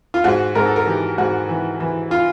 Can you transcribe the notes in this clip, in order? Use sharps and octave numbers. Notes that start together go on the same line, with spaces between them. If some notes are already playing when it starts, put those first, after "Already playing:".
F4
G#2 F#4
G#2 A#4
A4
A#4
E3 G4
G#2 F#4
E3
E3
F4